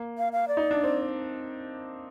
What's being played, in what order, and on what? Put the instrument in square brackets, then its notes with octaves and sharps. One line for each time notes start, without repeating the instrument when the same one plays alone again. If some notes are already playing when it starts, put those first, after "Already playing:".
Already playing: [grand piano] A#3
[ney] F5
F5
D5
[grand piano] D#4
D4
C4